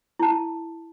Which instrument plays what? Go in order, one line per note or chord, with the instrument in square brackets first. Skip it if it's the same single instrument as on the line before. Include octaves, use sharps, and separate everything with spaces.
[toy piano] E4 A5